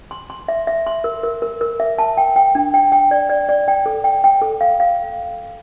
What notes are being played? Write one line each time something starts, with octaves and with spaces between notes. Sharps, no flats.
C6
C6
E5
E5
C6
A#4
A#4
A#4
A#4
E5
A5
G5
G5
D4
G5
G5
D5
D5
D5
G5
A4
G5
G5
A4
F5
F5